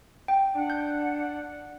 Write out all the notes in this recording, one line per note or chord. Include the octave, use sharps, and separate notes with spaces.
G5
D4 F#5
G6